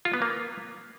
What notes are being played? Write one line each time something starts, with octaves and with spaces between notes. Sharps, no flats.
F4
B3
A#3